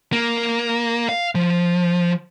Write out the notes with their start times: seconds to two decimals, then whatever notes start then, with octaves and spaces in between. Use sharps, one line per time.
0.13 A#3
1.09 F5
1.35 F3